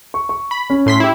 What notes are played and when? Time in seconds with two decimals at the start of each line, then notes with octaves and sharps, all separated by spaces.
0.14 C#6
0.29 C#6
0.51 B5
0.70 C#4
0.86 A2 C6 B6
1.00 E4 G4